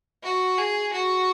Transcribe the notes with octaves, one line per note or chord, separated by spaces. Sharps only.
F#4
G#4
F#4